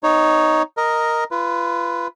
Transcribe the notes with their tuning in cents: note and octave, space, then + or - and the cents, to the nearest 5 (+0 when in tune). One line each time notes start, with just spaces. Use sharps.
B3 +45 D#4 +0 C#5 +5
A#4 +0 D#5 +0
F4 -25 B4 +0